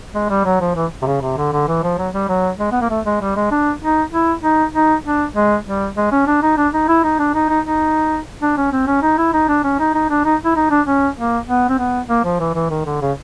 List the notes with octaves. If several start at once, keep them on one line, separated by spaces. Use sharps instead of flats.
G#3
G3
F#3
F3
E3
C3
C#3
C3
D3
D3
E3
F3
F#3
G3
F#3
G#3
B3
A#3
A3
G#3
G3
G#3
D4
D#4
E4
D#4
D#4
D4
G#3
G3
G#3
C#4
D4
D#4
D4
D#4
E4
D#4
D4
D#4
D#4
D#4
D4
C#4
C4
C#4
D#4
E4
D#4
D4
C#4
D#4
D#4
D4
D#4
E4
D#4
D4
C#4
A#3
B3
C4
B3
A#3
F3
E3
E3
D#3
D3
C#3